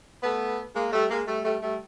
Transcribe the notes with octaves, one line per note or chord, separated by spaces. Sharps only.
A3 B3
G#3 A#3
G3 A3
G#3 A#3
G3 A3
G3 A3
G3 A3